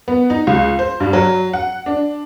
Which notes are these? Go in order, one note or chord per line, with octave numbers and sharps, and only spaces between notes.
B3
D#4
C#2
C5
G2
F#3
F#5
D4